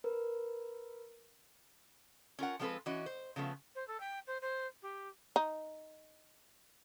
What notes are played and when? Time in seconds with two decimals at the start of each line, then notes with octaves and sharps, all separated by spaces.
0.04 A#4 B4
2.39 C#4 F4 A#4 F#5
2.59 F3 G#3 B3 C4 A4 B4
2.86 E3 C#4 F#4 D#5
3.06 C5
3.36 C#3 F3 A3 B3
3.75 C5
3.88 A4
4.00 G5
4.27 C5
4.42 C5
4.82 G4
5.36 D#4